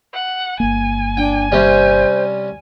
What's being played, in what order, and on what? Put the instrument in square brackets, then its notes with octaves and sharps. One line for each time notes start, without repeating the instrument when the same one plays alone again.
[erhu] F#5
[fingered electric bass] G1 A#3 [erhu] G#5
[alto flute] D4 [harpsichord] G5
[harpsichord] C3 G3 C#4 [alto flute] C5